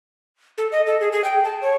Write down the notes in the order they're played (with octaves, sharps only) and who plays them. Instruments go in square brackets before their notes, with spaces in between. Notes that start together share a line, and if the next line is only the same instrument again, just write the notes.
[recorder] A4
D#5
A4
G#4
G#4
G5
A5
C#5